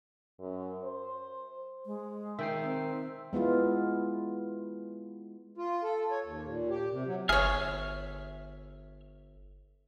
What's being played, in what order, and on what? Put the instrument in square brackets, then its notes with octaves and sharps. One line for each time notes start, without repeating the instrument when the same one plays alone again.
[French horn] F#2
C5
[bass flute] G#3
[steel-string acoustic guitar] D#3 [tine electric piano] E5 G5 C7
[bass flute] C4
[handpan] G#3 B3 E4 F4
[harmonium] F4
A4
C#5
D#2
A#2
G4
C3
F#3
[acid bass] G1 [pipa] G#4 C#5 [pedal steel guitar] E5 F6